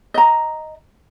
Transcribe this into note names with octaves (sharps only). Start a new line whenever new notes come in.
D#5 A#5